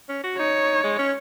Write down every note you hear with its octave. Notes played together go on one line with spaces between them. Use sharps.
C#4
F#4
D#4 C#5
G#3
C#4